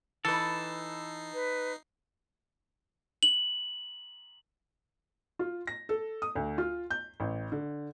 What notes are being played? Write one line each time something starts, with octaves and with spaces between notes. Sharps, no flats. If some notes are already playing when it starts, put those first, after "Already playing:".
E3 D#4 A4 B4 C7
B4
F#7
F4
A#6
A4
D#6
D2
F4
G6
A1
D3